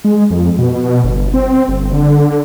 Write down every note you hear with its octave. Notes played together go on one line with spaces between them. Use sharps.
G#3
F2
B2
G1
C4
G1
D3